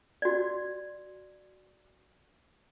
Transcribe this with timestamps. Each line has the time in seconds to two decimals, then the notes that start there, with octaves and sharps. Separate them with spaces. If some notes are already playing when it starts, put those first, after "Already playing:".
0.22 F#4 D5